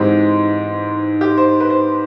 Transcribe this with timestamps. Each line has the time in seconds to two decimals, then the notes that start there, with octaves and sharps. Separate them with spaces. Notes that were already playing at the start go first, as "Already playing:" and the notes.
Already playing: G#2 E3 G#3 C4 G4
1.21 G4
1.38 C5
1.60 B4
1.70 C5